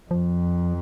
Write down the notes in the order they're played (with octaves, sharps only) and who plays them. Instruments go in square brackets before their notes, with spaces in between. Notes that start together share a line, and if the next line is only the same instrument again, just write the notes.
[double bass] F2 [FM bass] F3